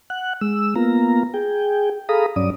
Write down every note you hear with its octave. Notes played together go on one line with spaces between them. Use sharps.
F#5 F#6
G#3 E6
A#3 B3 F4 A#5
G#4 G5
G#4 A4 F5 A#5 B5 D#6
G2 F#3 C#4 D5 D#6